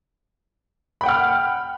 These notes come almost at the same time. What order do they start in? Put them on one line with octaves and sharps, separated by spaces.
B5 G5 F#5 F6